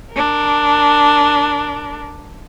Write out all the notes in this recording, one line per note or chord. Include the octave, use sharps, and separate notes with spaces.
D4 A#4